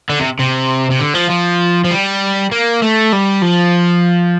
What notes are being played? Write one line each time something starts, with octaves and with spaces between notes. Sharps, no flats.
D3
C3
C3
C3
D3
F3
F3
F3
G3
A#3
A3
G3
F3